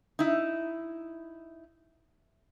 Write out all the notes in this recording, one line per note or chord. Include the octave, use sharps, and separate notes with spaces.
D#4 E4